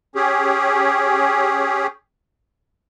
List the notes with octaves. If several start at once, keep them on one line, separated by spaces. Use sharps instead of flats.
C#4 G4 G#4